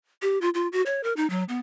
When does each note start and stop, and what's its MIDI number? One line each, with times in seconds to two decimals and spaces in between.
0.22 0.38 67
0.41 0.49 65
0.54 0.68 65
0.72 0.82 66
0.86 1.03 73
1.03 1.13 70
1.17 1.29 63
1.30 1.44 54
1.49 1.60 59